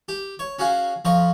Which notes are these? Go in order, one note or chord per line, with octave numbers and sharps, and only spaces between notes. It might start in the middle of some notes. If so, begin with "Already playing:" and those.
G4
C#5
C#4 F#4 G#4 F5
F2 F3 F4 D#5 C#6